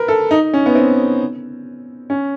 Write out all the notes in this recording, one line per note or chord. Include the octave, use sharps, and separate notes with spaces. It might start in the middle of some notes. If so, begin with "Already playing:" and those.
Already playing: A#4 B4
A4
D#4
C#4
B3
C4
C#4